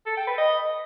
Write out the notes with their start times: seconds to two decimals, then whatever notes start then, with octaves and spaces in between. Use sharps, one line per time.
0.06 A4
0.17 G5
0.27 B4
0.38 D#5